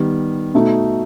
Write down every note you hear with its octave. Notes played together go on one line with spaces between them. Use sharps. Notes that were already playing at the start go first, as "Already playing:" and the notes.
Already playing: D#3 G3 B3
B2 A3 D#4 F#4